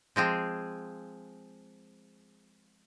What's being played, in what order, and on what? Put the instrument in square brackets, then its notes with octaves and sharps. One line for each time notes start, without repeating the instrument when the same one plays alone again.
[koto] F3 G#3 C4 G#4